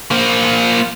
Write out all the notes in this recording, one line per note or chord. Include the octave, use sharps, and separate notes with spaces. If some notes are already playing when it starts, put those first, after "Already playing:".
A#3 C5